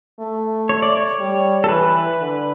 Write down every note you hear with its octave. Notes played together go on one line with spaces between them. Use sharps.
A3
C#5
D5
C#5
G3
A4
E3 B4
D3